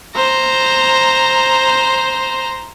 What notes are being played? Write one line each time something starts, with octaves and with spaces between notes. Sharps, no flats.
C5 A#5